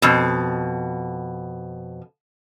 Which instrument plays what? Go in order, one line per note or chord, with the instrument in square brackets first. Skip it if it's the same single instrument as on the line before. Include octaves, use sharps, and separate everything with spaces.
[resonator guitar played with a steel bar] F2 B2